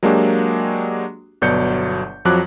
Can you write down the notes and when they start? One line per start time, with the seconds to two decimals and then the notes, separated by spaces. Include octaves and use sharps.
0.03 F#3 G#3 A#3 D4 F#4 G4
1.42 G1 B2 F#3 D5 G6 C#7
2.25 F2 F3 F#3 D6 F#6